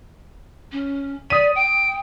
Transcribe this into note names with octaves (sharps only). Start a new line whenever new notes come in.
C#4
D5 D#6 B6 D#7
G5 D7